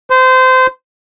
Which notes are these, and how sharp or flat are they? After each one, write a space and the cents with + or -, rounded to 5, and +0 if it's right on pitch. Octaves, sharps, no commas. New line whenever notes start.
C5 -25